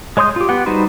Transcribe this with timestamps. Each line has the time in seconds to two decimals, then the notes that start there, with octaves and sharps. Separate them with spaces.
0.17 G#3 C#5 C6 D#6 G6
0.36 F4 G4
0.49 B3 G4 F#5
0.66 G3 D#4 F#4 B4 C5